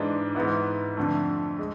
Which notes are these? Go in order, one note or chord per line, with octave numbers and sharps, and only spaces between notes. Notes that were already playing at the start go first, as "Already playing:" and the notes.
Already playing: G#2 E3 G#3 D4
G#2 E3 B3 E4
F2 D3 A3
G#3